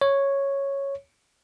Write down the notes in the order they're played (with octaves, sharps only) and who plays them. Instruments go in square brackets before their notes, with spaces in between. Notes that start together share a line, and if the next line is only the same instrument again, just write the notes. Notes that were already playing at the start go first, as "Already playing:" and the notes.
[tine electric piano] C#5